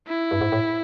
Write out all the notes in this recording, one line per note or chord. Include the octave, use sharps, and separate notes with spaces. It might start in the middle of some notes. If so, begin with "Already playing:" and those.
E4
G2
G#2
A2